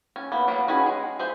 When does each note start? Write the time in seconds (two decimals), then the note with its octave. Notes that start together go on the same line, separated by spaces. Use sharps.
0.16 C#4
0.32 A#3 B3
0.47 F#3 A#3 B3
0.68 C#4 F#4 G#4 B4 D#5
0.86 G#3
1.19 G#4 C5 E5